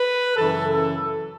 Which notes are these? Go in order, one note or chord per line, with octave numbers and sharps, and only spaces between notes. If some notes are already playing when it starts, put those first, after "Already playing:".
Already playing: B4
F#2 C#3 E3 A4
A4